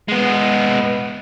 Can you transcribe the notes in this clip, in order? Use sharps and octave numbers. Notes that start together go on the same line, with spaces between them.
G#3 B3